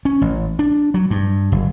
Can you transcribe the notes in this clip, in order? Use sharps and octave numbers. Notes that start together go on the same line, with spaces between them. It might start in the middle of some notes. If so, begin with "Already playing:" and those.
C#4
A1
D4
F#3
G2
F#1